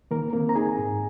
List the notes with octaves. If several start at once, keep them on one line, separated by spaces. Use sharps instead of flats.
D#3 A#3 A#4
A#3 C4 A#4
A#5
D#4 G#4 G#5
G#2